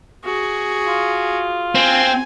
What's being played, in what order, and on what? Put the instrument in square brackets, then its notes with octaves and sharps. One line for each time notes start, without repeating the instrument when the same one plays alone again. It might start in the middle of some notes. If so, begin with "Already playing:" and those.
[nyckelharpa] F#4 G#4
[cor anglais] F4
[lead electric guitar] C4 [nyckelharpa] G#5